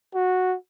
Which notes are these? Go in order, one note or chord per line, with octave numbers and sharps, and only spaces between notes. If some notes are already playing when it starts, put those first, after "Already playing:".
F#4